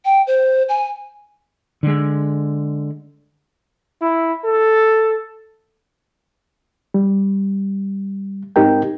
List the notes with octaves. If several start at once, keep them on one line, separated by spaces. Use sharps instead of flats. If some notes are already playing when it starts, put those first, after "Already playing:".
G5
C5
G#5
D3 G#3
E4
A4
G3
G#2 C4 D#4 G4 A#4 G5